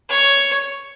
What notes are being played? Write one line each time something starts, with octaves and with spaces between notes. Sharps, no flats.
C#5